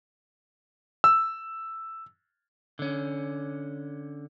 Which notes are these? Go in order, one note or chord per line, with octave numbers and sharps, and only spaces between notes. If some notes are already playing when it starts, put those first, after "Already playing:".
E6
D3 C#4